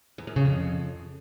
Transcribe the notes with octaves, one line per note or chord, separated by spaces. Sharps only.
E2
F#2
C#3
F2